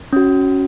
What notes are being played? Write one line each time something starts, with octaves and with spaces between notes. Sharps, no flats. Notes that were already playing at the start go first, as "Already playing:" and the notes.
C#4 F#4